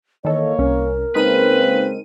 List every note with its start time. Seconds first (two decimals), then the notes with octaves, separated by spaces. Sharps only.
0.25 D#3 E3 A#3 A4 C#5 D#5
0.59 C2 C#4 A#4
1.15 C#3 G#3 A#3 C4 D#4 B4 D#7